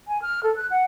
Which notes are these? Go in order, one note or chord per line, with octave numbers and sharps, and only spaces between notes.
G#5
F6
A4
F#6
F#5